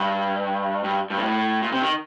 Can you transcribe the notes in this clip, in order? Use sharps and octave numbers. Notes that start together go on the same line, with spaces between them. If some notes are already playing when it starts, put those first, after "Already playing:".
Already playing: G2
G2
G2
A#2
A2
A#2
C3
D#3